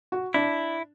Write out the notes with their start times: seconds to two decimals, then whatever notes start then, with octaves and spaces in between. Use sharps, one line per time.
0.12 F#4
0.34 D4 E4